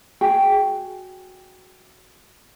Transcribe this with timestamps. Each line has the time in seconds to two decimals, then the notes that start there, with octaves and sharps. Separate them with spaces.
0.21 F#4 G#4 G5